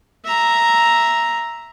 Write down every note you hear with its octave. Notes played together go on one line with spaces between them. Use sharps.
E5 A#5